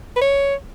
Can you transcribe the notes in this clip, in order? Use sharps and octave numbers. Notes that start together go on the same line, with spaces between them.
B4
C#5